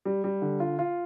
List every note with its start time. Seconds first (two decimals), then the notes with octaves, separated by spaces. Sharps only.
0.05 G3
0.24 G3
0.42 D3
0.60 F4
0.79 F4